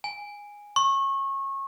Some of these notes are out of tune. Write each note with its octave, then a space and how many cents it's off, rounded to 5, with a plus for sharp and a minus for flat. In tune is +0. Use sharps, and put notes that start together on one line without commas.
G#5 -10
C#6 -25